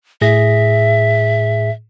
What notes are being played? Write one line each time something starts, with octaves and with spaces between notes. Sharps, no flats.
A2 G#4 E5 A#6